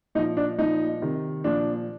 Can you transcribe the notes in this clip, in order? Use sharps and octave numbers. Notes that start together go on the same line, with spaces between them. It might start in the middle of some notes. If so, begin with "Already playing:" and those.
A#2 F3 D#4
D4
A#2 F3 D#4
C3 D#3
A#2 F3 D4